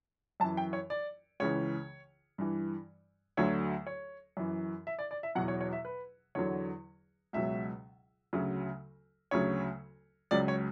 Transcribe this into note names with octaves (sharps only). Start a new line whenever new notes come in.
F#2 E3 A5
G5
C#5
D5
C#2 C#3 E3 C#5
G2 E3
D2 D3 F#3 C#5
C#5
F#2 E3
E5
D5
D5
E5
E2 B2 F#3 F#5
C#5
C#5
E5
B4
E2 D3 F#3 C#5
C#2 B2 F#3 E5
D2 C#3 F#3
D2 C#3 F#3 C#5
C#2 C#3 F#3 D5
C#5